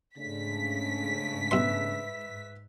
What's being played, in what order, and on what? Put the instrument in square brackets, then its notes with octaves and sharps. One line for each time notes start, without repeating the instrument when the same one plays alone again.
[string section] G#2 B6 [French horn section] C#3 A3 D4
[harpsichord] B1 C6 [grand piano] B4 E5 E6